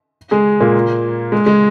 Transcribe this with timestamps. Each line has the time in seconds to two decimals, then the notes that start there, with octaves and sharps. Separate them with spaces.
0.31 G#3 G#4
0.61 A#2 A#3
1.32 G#3
1.46 G#3